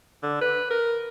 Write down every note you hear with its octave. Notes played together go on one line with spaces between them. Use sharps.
D3
B4
A#4